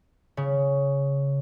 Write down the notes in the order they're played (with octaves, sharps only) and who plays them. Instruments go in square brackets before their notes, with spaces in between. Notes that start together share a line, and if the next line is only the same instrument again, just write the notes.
[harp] C#3